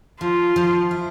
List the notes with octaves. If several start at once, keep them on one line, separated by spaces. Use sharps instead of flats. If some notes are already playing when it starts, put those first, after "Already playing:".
F3 F4
F3
E4